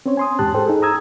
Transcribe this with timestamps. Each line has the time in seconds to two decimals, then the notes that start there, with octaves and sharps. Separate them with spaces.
0.06 C4 C#4 C5 C#5
0.17 G#5 C6 D#6
0.39 E2 G#2 G4 A5 F#6
0.54 G#4 A4 C5 G5
0.66 D#4 G#4 A4
0.82 A#5 D#6 E6 G#6